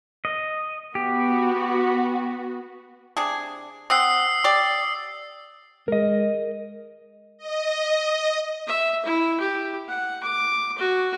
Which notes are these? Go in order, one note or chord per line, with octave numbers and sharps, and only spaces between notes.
D#5
B3 F#4 G4
C3 D4 G#4
C4 F#5 D#6 E6 C7
G4 D5
G#3 A#4 D#5
D#5
E5
E4
G4
F#5
D6
F#4